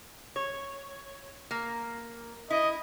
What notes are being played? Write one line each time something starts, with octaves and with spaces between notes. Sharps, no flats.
C#5
A#3
E4 D#5